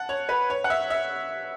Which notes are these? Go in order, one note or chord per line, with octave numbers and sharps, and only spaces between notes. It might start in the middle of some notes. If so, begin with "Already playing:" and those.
Already playing: F#5 A5
C#5
B4
C#5
F#5
E5
E5